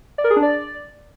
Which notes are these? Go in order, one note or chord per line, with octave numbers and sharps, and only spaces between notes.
D5
A#4
G#4
D4
D5